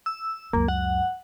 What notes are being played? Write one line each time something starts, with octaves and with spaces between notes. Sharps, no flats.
E6
C#2 F#2 A#3
F#5